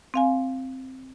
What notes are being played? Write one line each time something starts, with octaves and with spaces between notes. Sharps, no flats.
C4 F5 G#5